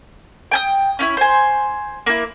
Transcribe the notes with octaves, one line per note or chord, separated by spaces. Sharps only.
G5 G#5 D#6
C#4 D#4 E4
C5 G#5
A#3 E4